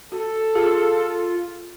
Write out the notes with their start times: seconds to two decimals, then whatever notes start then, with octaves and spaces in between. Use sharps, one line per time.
0.12 F#4 A4
0.55 F4 G#4